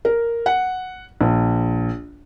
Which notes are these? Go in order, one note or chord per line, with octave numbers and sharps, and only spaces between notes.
A#4
F#5
A#1